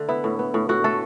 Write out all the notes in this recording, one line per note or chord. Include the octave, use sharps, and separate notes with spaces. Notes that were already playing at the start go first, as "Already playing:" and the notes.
Already playing: D3 A3
B3 E4
A2
B3
A2
A2 F#4
A3 A4